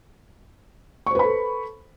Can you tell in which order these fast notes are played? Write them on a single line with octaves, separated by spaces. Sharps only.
C#6 C5 B4 B5 A4